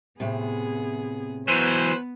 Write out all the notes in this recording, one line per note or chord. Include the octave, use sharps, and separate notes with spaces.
A2 C3 B3 G#4
E3 F#3 B3 B4 C5